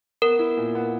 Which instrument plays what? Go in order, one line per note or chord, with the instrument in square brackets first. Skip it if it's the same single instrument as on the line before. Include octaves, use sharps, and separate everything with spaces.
[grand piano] B3 [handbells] A#4
[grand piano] E4
A#2
B3